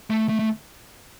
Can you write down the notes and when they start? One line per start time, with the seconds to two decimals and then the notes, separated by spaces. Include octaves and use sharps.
0.10 A3
0.29 A3
0.39 A3